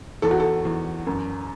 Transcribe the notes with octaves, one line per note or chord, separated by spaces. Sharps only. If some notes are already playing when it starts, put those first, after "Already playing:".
E2 A4
F#4
A4
E2
F#2